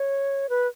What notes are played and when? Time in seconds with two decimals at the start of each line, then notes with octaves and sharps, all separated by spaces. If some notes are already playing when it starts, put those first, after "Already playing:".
Already playing: C#5
0.49 B4